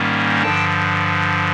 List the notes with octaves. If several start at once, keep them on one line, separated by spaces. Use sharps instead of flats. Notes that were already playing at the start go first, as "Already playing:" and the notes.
Already playing: G#2 D#3 G3 A#3 C#4
G2 D3 F3 G5 A5